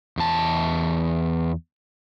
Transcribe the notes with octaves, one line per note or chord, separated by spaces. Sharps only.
E2 A5